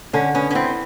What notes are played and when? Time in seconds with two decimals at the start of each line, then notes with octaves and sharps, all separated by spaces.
0.13 D3 C#4
0.34 B3 C#4
0.50 C#4
0.55 C4 E4